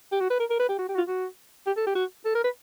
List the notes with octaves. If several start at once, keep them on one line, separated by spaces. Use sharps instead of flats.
G4
F#4
B4
A#4
A#4
B4
G4
F#4
G4
F#4
F4
F#4
G4
A4
G4
F#4
A4
A#4
B4